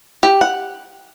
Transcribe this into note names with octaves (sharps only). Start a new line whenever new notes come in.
G4
F#5